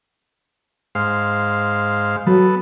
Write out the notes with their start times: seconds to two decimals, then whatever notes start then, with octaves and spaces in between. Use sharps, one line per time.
0.95 G#2 C5 F5
2.27 F#3 B3 A4